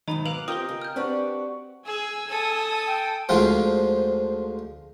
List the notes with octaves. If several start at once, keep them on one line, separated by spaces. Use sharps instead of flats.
G#2 B2 D#3 F#3 D#5 A#5 B5
B4 F5 D6 F#6 F7
C4 F4 G4 A#4 D#5 G5 D#6 G7
C#3
F6 G6
C4 D4 F#4 G4 B4 D5 G5
G#4 G#5 E6
A4 A5 D#6
G5
D2 F3 G#3 D#4 F4 C5